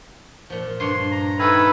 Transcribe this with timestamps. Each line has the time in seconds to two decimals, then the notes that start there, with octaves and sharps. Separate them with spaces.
0.50 A#2 F3
0.80 G2 D4 C#5 C6
1.11 A#5
1.39 D#3 A4 B4 E5 G#5